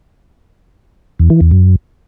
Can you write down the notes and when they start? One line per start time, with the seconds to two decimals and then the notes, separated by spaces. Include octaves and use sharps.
1.19 E2
1.30 E3
1.41 E2
1.51 F#2